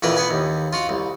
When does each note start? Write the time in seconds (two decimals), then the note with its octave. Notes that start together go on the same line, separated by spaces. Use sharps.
0.02 A#1 F2 E3 A#4 B4 B5
0.16 B3 B4 G#5
0.31 D#2
0.73 F4 F#4 F5
0.89 C2